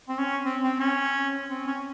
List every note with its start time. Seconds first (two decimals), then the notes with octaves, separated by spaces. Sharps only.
0.09 C4
0.19 C#4
0.45 C4
0.63 C4
0.80 C#4
1.50 C4
1.67 C#4